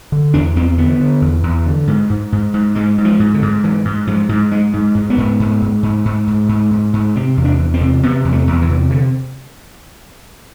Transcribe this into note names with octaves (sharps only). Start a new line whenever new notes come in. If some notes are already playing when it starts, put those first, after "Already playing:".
D3
E2 D4
E2 C4
D3 B3
D3
E2
E2
D3
G#2
G#2
G#2
G#2
G#2 G#3
G#2
F3
G#2
D3
G#2
G#2 E3
G#2
G#2 F3
G#2
G#2 G#3
G#2
G#2
B3
G#2
G#2
G#2
G#2
G#2
G#2
G#2
G#2
G#2
C3 C4
E2
D4
E2
C4
C3
C3 B3
E2
A3
E2
E3
C3
D3